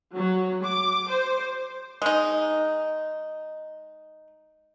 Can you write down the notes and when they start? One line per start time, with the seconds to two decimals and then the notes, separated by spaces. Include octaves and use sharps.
0.15 F#3
0.62 D6
1.10 C5
2.02 G#3 D#4